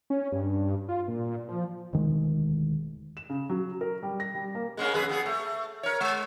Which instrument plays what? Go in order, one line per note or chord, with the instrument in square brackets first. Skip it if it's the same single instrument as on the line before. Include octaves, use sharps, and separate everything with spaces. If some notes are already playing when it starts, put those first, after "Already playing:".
[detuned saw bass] C#4
G2
F4
A#2
F3
[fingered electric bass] E1 D2 D#3 G#3
[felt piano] E7
C#3
F#3
A#4
G3
A#6
G3
A#3
[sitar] G#3 A#3 C#4
F2 G#4 B4
F2 B3 G#4
A3
A#4 C#5
G#3